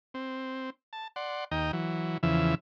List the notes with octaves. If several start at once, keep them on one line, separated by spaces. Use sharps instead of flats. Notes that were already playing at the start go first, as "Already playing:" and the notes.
C4
A5
D5 F#5 C6
D#2 D#5 G5 A#5
E3 F#3
E2 C#3 E3 F3 E5